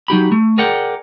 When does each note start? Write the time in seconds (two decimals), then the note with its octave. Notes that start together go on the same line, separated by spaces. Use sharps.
0.08 F#3 D#4 G4 B5
0.32 A3
0.58 G#4 A#4 D5 F#5 G5